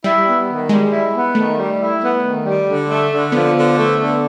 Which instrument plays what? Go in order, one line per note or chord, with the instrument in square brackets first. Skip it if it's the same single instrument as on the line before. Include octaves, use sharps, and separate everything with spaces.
[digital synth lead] G3 [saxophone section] E4
[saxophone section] B3
D#3
[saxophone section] G3 [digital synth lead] G#3
[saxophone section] E4
B3
[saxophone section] D#3 [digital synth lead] A3
[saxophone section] G3
E4
B3
D#3
G3
D3
A3
D3
[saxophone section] F3 [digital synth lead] B3
[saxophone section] D3
A3
D3